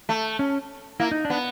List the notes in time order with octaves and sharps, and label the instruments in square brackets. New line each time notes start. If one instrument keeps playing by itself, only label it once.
[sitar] A3
[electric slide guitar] C#4
[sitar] A#3 [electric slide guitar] E4
[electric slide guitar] D#4
D4
[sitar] B3